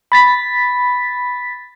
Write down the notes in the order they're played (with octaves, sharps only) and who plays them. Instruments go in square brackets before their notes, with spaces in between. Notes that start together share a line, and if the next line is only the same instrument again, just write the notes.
[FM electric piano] B5 A6 B6